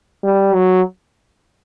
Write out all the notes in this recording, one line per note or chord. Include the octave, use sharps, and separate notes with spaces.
G3
F#3